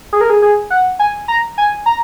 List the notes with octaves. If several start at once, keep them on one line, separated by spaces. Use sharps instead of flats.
G#4
A#4
G#4
G#4
F#5
G#5
A#5
G#5
A#5